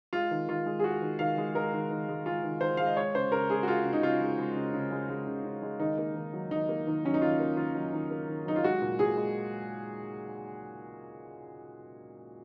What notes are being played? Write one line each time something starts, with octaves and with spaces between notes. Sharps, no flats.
G#3 F4
D#3
D#3 F4
G#3
G#4
G#3 F#4
D#3
D#3 F5
G#3
G#3 A#4
D#3
D#3
G#3
G#3 F4
D#3
D#3 C5
G#3 F5
D#5
G#3 C#5
C#3 C5
C#3 A#4
G#3 G#4
F#4
G#3 F4
C#3
D#4
C#3 F4
G#3
G#3
C#3
C#3
G#3
G#3
C#3
C#3
G#3
D#3 D#4
A#3
D#3
F#3
D#3 D#4
A#3
D#3
F#3 C#4
D#4
D#3 F4
A#3
D#3 F4
F#3
D#3
A#3
D#3
F#3 D#4
F4
G#3 F#4
A#2
A#2 G#4
G#3